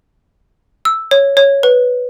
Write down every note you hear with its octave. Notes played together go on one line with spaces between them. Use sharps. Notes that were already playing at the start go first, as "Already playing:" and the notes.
E6
C#5
C#5
B4